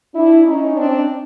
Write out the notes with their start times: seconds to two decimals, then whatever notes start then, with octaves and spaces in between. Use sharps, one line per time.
0.14 D4 E4
0.45 C#4 D#4
0.75 C4 D4